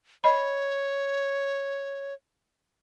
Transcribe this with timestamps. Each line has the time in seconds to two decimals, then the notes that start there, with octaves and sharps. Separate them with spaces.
0.24 C#5 D#5 B5